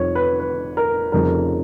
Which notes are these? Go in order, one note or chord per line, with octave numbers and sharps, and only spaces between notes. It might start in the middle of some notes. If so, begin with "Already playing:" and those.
Already playing: F1 F2 F3 C#5
B4
B4
A#4
F1 F2 C#3 F3 A#4